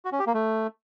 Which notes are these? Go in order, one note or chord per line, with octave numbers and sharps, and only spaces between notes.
F#4
C#4
G4
A#3
A3